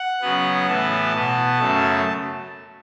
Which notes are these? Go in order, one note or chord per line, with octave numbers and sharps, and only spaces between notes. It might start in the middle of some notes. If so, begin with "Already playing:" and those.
Already playing: F#5
C#3 F#3 B3
A2 E3 B3 A5
B2 B3
F#2 C#3 A3